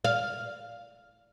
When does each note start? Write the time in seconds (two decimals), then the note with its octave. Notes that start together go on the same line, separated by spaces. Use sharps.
0.05 F5